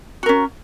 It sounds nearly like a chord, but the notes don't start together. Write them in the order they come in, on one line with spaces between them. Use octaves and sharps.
F#4 A#4 C#4